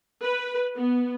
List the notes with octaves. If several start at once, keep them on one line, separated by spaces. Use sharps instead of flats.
B4
B3